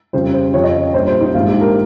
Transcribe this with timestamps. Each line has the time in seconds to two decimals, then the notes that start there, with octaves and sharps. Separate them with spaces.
0.13 F2 C#3 G3 C5
0.34 C5
0.53 F2 C#3 F3 C#5
0.64 D#5
0.74 C#5
0.94 A#1 A#2 G3 C5
1.07 C5
1.21 D#4
1.34 A#1 G#2 F3 F4
1.48 G4
1.61 A#4